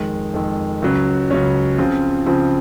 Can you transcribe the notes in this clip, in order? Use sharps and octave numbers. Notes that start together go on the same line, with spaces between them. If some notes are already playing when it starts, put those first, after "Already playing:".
Already playing: F2 D#3 G#3
F2 D#3 G#3
C#2 C#3 F#3 C#4
C#2 C#3 F#3 C#4
C#3 F3 C4 F4
C#3 F3 C4 F4